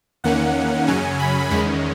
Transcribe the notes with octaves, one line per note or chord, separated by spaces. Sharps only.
E2 D#3 A#3 C#4 F#5
F#2 C#3 F#3 C#4 G#5
B5
E2 D#3 G#3 C#4 B5